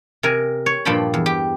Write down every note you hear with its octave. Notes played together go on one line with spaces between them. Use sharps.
C3 A#4 G#5
C#5
G2 A#2 F3 G5 A5 B5
E2
G4